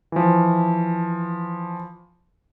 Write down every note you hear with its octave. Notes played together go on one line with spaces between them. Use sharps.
E3 F3